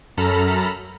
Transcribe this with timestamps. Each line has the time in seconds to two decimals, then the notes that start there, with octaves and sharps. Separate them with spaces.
0.17 F#2 A4 A#5 B5 F6